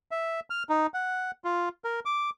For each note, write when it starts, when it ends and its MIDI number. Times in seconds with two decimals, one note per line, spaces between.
0.11 0.40 76
0.50 0.63 89
0.69 0.87 63
0.94 1.31 78
1.44 1.69 65
1.84 2.00 70
2.05 2.30 86